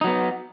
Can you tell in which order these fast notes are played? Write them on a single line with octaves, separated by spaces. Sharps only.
D#4 F#3 B3